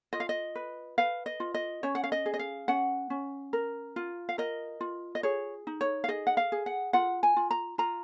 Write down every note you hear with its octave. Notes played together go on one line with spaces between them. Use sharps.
F4 D#5
F5
D#5
B4
B4 F5
D#5
F4
D#5
C#4 C#5
F#5
F5
D#5
G#4
D#5
F5
C#4 F#5
C#4
A#4
F4
F5
A#4 D#5
F4
D#5
G#4 C#5
D#4
C#5
F5
G#4 D#5
F#5
F5
G#4
F#5
F4 F#5
G#5
F4
A#5
F4 A#5